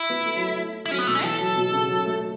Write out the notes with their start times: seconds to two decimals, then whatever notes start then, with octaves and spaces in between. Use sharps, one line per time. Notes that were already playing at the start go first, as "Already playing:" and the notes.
Already playing: E4
0.10 B3
0.26 A3
0.36 F#3
0.46 A3
0.86 E4
0.91 F#3 C#4
0.99 B3
1.07 B2 A3
1.15 C#4
1.23 E3 A4
1.39 F#3
1.56 B2
1.72 C#3
1.89 F#3
2.05 A3
2.21 A3